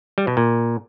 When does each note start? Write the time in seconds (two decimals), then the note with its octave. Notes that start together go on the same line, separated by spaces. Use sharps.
0.18 G3
0.27 B2
0.37 A#2